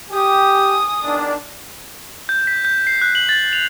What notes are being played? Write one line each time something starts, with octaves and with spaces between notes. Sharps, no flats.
G4 G#5 D#6
E2 D#3 D4
G6
B6
G6
C7
F#6
F#7
A6
F7